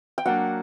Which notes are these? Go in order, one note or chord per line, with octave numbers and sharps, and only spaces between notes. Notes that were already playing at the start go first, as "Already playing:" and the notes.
G5
F#3 A#3 D4 F#5